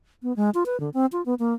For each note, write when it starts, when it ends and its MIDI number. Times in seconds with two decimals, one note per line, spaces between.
0.23 0.35 59
0.36 0.50 56
0.54 0.64 65
0.66 0.79 71
0.80 0.90 50
0.94 1.06 60
1.12 1.24 65
1.26 1.34 59
1.39 1.54 58